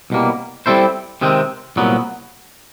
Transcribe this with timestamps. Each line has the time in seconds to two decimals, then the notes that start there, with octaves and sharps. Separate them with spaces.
0.10 C2 B2 G3 A#3
0.66 G3 C4 E4 A4 C5
1.21 C3 D#3 G#3 C4
1.76 C2 A#2 F#3 B3